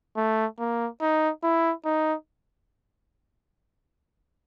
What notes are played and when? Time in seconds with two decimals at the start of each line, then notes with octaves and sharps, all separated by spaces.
0.17 A3
0.59 A#3
1.01 D#4
1.43 E4
1.85 D#4